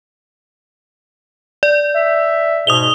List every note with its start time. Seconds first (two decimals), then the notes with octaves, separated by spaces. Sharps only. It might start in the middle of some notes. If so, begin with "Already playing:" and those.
1.63 D5
1.95 E5
2.67 G#2 B2 D#6 F7 G7